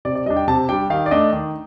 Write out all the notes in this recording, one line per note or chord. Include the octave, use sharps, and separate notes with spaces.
C3 D5
D5
G3 D4 D#5
G5
C3 A5
G3 D4 G5
D#3 F5
D5
A3 D4 D#5
D#3